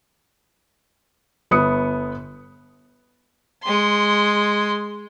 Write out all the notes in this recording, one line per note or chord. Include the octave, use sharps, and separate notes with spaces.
G1 B3 D#6 C#7
G#3 C6